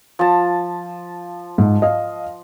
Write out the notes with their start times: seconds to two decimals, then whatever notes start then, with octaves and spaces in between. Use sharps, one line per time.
0.19 F3 A5
1.58 G#2
1.82 D#5 F5